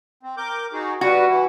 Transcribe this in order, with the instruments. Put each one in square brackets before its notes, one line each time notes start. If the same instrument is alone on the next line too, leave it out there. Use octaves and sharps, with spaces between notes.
[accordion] C4
A#4 D6 G6
D#4 F#4 G#4
[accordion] G3 B4 [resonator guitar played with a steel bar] F#4
[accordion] E3 E4